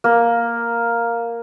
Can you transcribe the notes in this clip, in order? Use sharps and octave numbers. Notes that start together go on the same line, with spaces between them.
A#3